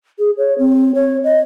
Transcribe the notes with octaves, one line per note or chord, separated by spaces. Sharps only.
G#4
C#5
C4
C#5
D#5